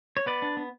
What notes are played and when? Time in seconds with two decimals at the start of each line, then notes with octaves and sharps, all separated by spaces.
0.17 C#5
0.26 B3 B4 D5
0.42 D4
0.57 B3